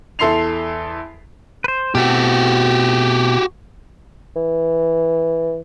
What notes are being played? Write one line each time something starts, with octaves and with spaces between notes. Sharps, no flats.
E2 A4 E5 C6 C7 F7
B4 C5
B2 A3 C4 F#4 G4
E3